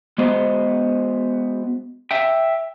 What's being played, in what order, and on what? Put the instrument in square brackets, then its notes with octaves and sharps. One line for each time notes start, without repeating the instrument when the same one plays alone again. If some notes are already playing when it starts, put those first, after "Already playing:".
[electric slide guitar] G#3 B3 F#4 C5 D#5
E5 G5